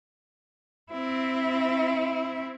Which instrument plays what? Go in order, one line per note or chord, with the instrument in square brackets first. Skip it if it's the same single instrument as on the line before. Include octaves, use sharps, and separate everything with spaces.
[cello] C4 E4